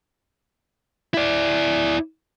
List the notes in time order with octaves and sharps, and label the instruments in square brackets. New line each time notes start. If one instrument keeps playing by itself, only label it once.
[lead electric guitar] E4 D5